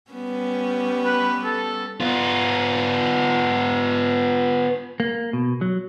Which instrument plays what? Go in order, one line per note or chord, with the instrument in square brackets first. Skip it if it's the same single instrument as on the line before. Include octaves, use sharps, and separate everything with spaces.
[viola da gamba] G3 B3 C#4
[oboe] B4
A4
[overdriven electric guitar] B3 F4
[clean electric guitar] A#3
B2
F#3